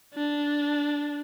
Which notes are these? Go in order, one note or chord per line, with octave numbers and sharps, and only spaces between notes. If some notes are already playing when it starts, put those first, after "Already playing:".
D4